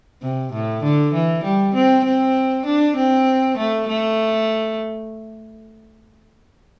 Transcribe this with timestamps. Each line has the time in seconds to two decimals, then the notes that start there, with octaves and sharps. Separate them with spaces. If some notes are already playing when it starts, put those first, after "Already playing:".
0.22 C3
0.52 A2
0.83 D3
1.14 E3
1.44 G3
1.75 C4
2.05 C4
2.66 D4
2.97 C4
3.57 A3
3.88 A3